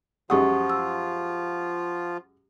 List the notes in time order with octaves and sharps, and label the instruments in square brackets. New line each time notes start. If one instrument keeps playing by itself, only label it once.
[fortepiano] F#2 G#3 D#6 [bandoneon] F3 F4 [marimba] G4 [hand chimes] F#5 C#6
[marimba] E6